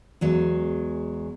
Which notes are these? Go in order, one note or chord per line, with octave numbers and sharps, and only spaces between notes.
E2 F#3 G#3